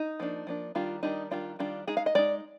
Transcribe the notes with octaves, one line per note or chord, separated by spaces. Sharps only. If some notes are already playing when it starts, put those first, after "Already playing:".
Already playing: D#4
F3 A#3 D4
F3 A#3 D4
D#3 G3 D4 F4
D#3 G3 D4 D#4
D#3 G3 D4 F4
D#3 G3 D4 F4
G#3 D#4 G#4
F5
D#5
G#3 D#4 D5